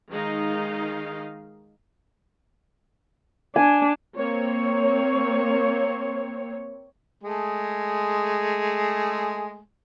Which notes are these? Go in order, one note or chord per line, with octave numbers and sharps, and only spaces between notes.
D#3 G#3 D#4 D#5 F5
D4 G#5
A#3 C4 C#5
G#3 A3 G#4